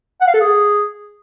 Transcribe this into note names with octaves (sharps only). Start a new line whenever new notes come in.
F#5
F5
A4
G#4